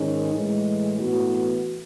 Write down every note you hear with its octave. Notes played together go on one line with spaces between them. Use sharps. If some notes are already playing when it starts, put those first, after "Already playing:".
Already playing: G#2 D#3 G#3 C#4
A2 E3 G#3
A2 E3 B3 F#4